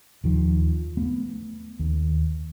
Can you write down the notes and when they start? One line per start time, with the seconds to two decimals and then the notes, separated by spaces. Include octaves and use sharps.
0.24 D#2 D#3 F3
0.97 A3 B3
1.79 D#2